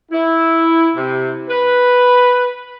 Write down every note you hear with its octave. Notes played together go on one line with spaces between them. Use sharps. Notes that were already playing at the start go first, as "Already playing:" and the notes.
E4
C3
B4